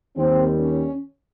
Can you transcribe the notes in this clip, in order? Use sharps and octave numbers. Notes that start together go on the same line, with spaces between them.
D#2 D#3 G3 C4
C#4